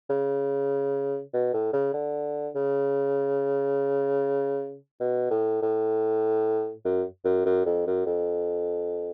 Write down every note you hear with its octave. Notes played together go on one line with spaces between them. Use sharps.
C#3
B2
A2
C#3
D3
C#3
B2
A2
A2
F#2
F#2
F#2
F2
F#2
F2